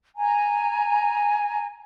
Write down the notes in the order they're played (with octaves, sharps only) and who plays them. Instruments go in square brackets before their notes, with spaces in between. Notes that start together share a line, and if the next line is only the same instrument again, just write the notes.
[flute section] G#5 A#5